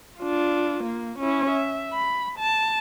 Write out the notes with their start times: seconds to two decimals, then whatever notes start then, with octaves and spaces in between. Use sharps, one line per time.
0.18 D4 F4
0.83 A#3
1.18 C#4 E4
1.50 E5
1.93 B5
2.38 A5